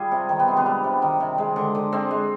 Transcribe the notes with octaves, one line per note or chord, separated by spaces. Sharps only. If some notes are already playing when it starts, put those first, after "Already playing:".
Already playing: G3 F4 G#4
C3
D#3
B3
C3 C4
B3 D4
G3
C3
D#3
C3
G#3
D3
D3
G#3 C4
G#3